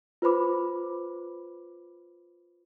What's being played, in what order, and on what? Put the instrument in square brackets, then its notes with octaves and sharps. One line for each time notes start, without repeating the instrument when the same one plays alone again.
[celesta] F4 B4 C5 B5 D6